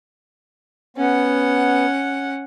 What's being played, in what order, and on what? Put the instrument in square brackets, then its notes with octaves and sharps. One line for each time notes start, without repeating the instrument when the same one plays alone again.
[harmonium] B3 [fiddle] C#4 F#5